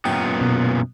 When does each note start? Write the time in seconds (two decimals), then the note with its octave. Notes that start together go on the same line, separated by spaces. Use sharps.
0.05 F#2 A#2 B3 G5
0.41 B2